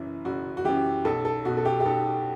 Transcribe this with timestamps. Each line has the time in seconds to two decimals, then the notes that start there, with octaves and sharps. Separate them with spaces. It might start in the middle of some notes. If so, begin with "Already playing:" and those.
Already playing: F#1 F#2 E3
0.25 F#1 F#4
0.57 F#4
0.65 F#2 E3 G4
1.05 B1 A4
1.25 A4
1.45 B2 F#4
1.57 A4
1.65 G4
1.80 G4
1.85 B1 A4